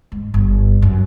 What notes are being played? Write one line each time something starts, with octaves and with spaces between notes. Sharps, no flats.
G#2
G1
F#2